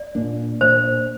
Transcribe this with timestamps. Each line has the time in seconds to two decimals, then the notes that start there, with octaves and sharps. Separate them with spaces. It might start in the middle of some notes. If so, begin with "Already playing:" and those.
Already playing: D5
0.15 A#2 A#3 D4
0.61 A#2 A#3 D4 C5